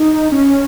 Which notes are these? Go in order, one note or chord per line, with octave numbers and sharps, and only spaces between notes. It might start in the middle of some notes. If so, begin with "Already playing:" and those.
Already playing: D#4
C#4